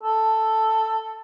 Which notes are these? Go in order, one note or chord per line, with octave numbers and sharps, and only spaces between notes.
A4